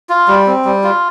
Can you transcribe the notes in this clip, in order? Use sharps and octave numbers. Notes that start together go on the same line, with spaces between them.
F4
G3
C4
G3
F4